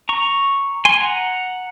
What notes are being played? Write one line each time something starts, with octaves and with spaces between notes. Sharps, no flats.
A#5 C#6
G#5 C6
F#5 A#5